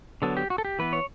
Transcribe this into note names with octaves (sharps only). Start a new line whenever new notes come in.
D3 F#3 B3 A4
G4
F#4
A4
G4
E3 B3 B4
C#5